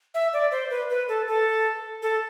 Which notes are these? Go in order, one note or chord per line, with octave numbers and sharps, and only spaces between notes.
E5
D5
C5
B4
B4
A4
A4
A4